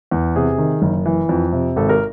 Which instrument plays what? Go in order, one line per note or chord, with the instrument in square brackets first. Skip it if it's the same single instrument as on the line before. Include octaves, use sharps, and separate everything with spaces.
[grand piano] E2
C3 G#4
D#3
F#1
E3
F2
C3
G#1 A4
A#4